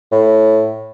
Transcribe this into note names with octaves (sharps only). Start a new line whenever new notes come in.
A2